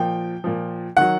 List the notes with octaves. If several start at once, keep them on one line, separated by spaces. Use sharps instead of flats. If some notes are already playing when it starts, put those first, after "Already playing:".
Already playing: A#2 F3 G5
A#2 F3
D#3 F#3 F#5